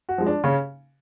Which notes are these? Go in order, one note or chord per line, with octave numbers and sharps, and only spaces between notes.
F#4
F3 G#3
D4
C#3 C#4